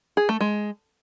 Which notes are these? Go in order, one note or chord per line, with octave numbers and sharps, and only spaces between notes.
G#4
A3
G#3